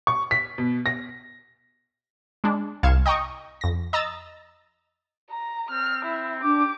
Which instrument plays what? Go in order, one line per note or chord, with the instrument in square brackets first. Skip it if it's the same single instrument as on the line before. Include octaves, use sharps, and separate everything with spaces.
[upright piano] C#6
B6
B2
A#6
[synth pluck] G#3 D4
C2 F5 G#6 C#7 E7
D#5 G5 A#5 C#6 D#6
F2 A#6
D#5 A#5 E6 A6
[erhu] A#5
[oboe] C4 [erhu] F6
[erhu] E4
[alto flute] D4 [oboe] G4 [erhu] D6